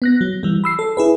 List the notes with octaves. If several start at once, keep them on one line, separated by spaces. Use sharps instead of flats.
B3 F#6 A#6
F#3
E3 G3
B5 E6 C7
A4
E4 G#4 B4